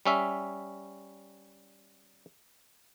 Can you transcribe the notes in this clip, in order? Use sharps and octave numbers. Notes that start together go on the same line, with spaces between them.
G3 C#4 E5